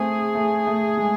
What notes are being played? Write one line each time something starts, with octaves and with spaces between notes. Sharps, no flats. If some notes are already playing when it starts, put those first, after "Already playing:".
Already playing: A3 C4 G#4
A3
A3
G#3